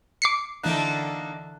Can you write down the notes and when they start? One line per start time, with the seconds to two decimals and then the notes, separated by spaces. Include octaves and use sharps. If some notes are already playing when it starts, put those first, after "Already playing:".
0.22 D6 C7 C#7
0.63 D3 E3 A#3 D4 D#4 A4 F#6